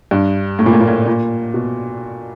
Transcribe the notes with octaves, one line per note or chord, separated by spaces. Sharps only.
G2
A2
A#2
A2
A#2
A2
A#2
B2